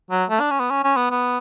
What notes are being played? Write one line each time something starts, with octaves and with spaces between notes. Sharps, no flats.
F#3
A3
D4
C#4
B3
C#4
C#4
B3
B3